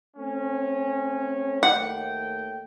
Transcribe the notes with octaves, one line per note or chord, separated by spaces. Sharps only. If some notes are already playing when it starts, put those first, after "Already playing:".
A3 C4 C#4
D#2 A3 F#5 G5